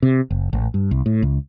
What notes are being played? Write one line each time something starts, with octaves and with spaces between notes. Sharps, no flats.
C3
F#1
A1
G2
C2
A2
C#2